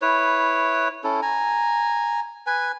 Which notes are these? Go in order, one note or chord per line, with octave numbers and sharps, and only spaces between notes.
E4 B4 C#5
C#4 E4 A4
G#5 A#5
B4 G#5